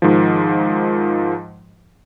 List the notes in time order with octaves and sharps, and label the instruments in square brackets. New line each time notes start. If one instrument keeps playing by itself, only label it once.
[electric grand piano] G#2 D#3 F3